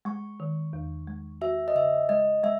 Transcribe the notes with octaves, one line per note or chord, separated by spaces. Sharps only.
G#3 C#6
D#3
E2
G#3
F#4 E5
D#5
C#3 E5
G#3 D#5
G#3 E5